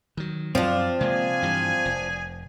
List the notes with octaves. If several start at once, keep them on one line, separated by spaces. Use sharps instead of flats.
D#3 F#3
F#2 F3 F#3 C4 D4 F4
C3 G#3 A#3 G#4 G#5
G2 E3 G3
F1